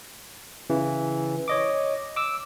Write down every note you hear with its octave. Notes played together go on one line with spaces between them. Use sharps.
C#3 E3
C#5 D#5 D6
D6 E6